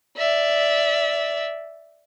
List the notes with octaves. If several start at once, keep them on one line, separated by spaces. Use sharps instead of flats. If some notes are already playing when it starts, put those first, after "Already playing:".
D5 E5